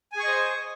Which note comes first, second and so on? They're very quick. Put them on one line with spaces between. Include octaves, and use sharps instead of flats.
G#5 G#4 C#6 D#5 C5